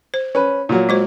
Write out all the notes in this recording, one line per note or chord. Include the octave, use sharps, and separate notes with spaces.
C5
C#4 B4
A#2 F#3
G#3 F#4 C5